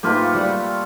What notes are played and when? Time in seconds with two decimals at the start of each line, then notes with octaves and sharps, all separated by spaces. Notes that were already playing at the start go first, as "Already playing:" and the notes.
0.03 G#2 A3 A#3 F4 G4 B4
0.34 G3 F#4 F#5